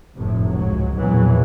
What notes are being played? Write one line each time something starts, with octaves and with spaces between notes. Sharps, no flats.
F1 A2 C3
C#2 G#2 F#3
A#1 E2 B2 E3 F#3